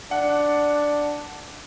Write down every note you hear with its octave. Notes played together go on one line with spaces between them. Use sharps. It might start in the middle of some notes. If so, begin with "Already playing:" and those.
D4 F#5